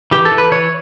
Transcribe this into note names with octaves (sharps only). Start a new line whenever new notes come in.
E3 G4
A4
E3
B4
E3 C#5